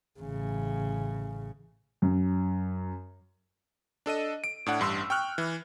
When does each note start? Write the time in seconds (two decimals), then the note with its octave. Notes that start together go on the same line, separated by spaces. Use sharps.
0.20 A1 C#3
2.02 F#2
4.06 D4 A4 D#5 D#7
4.44 D7
4.66 A2 D4 F#5
4.79 A1 G2 C6 E6
5.10 G5 C#6 F6 F#6
5.38 E3